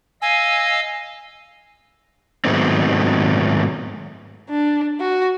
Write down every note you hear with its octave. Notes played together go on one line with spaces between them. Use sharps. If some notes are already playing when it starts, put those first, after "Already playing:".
D#5 F5 G#5 E6
G#2 D#3 F#3 A3 B3 C4
D4
F#4